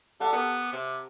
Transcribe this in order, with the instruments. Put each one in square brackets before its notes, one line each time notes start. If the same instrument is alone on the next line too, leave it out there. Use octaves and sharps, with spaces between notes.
[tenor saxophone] G3 [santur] A4 F#5
[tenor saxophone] B3 [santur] G4 A#4 G#5
[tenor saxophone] C3